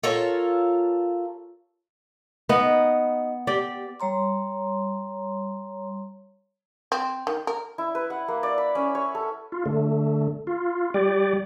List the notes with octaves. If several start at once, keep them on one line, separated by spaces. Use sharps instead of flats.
F4 A4 A#4 C#5
B3 D#4 A#5
G4 D5
G3 C#5 A#5 C6
C4
D#3
A#4
E4
B4
F#5
A#3
D5
B5
C#4
C#5
A4
F4
D3 A3
F4
G3 G4 D5